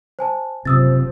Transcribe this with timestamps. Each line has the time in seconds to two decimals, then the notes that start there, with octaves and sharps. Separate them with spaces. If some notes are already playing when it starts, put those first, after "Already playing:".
0.19 C5 G#5 A5
0.65 F#1 C3 F3 D#6 E6 A6